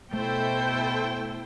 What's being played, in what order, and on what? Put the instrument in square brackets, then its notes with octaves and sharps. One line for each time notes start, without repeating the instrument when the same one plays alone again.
[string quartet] B2 [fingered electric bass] A3 [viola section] E4 A4 C5 [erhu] G5